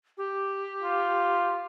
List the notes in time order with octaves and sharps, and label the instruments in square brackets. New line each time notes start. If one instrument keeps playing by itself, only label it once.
[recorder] G4
[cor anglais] F4